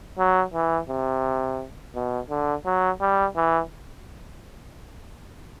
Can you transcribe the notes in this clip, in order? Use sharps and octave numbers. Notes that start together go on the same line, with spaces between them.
F#3
E3
C3
B2
D3
F#3
G3
E3